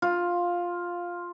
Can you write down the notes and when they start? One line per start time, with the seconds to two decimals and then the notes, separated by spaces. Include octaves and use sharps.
0.02 F4